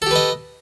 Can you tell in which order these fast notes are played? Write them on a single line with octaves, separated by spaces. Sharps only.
A4 G4 B4 D#5